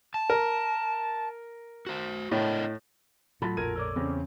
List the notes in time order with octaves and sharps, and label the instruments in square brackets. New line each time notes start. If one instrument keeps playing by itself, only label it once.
[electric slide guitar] A5
[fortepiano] A#4
[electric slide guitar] F#4 C5
[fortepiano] A2 [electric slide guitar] D4 A#4 D#5
[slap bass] A2 F#3 A3 [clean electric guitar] F4 F#4 A4 [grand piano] B5
[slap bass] A#1 F2 A2 [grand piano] A#4 G#6 D#7
[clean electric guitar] A4 C#5 D5
[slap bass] E2 [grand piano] C#3 C4 C#4